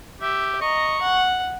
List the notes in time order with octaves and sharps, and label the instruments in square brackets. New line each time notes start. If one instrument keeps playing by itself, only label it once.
[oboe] G4 [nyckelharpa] E5
[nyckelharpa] D#5 A#5 [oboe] C#6
[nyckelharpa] F#5